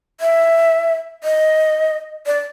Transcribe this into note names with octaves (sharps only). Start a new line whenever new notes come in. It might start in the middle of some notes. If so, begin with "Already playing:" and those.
E5
D#5
D5